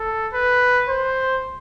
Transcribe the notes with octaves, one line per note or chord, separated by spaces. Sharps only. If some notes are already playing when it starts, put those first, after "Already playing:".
Already playing: A4
B4
C5